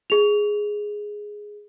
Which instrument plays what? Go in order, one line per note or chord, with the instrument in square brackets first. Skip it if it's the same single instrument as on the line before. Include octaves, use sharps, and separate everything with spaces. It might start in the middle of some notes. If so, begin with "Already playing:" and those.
[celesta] G#4 F7